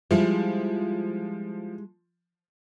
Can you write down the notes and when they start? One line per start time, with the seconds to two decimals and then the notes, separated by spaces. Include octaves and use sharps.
0.11 F3 G3 G#3 E4